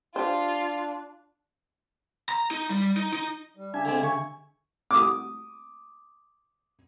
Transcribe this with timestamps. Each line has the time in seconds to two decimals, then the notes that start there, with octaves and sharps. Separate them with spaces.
0.16 D4 F4 G4 C5
2.29 A#5
2.51 D#4
2.70 G3
2.97 D#4
3.13 D#4
3.57 G3
3.74 C#3 D4 G4 E5 G#5
3.85 D3 G#3 C4
4.03 D3 C#6
4.91 D6 D#6